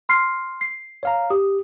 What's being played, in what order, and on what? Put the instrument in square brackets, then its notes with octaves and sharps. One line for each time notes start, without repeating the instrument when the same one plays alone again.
[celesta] C6 F6 C7
C7
[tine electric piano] C#5 F5 A#5
[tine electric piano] G4 [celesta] D#6